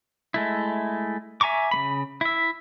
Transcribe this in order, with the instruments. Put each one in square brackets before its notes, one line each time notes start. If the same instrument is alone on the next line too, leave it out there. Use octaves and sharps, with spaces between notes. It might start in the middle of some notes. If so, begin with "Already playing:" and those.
[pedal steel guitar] G#3 A3 E4
E5 G#5 A#5 C#6 D6
C#3 A3 B5
E4 E5